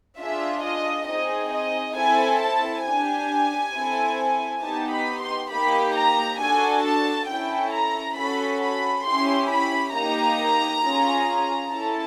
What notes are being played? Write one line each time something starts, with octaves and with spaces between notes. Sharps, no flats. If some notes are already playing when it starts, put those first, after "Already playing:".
D4 F4 G#4 E5
D#5
C4 D#4 G#4 D#5
D#5
C4 E4 A4 G#5
A5
D4 G4 G#5
C4 E4 A4
B3 D#4 G4 A5
B5
C6
A#3 D#4 G4 B5
A#5
D4 F#4 A4 G#5
A5
C#4 E4 A4 G5
A#5
C#4 F#4 A4 B5
B5
C#4 E4 G4 C6
B5
A#3 D#4 G4 A#5
C#4 F4 G#4
C#4 E4 A4 A5